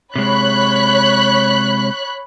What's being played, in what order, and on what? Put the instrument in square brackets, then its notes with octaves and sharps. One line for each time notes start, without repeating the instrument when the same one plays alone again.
[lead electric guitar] C3 G#3 [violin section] C#5 B5 F#6